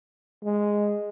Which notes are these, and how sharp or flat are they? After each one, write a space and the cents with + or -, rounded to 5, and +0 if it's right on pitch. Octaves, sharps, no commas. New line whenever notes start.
G#3 -5